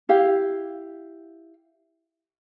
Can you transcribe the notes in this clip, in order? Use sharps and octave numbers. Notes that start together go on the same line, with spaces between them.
E4 G4 F5